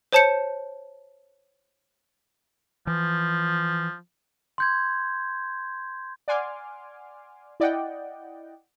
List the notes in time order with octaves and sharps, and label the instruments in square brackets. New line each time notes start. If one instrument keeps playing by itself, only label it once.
[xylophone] C5 C#5 A5 G6 C#7 E7
[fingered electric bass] E3 [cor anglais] F3
[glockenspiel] C6 G6 G#6
[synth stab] D5 F#5 G#5 C6 D6 F6
E4 D5 D#5 F#5 G5